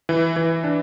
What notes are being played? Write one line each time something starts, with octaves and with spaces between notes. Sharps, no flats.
E3
E3
D4